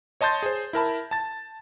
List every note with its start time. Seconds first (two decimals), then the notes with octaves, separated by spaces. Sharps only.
0.21 C#5 D#5 A5 C6 G6 A6
0.43 G#4 C5
0.73 E4 A#4 A5 B5
1.11 A5 A6